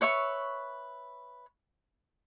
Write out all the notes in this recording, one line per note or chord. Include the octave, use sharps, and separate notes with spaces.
B4 C#5 E5 C#6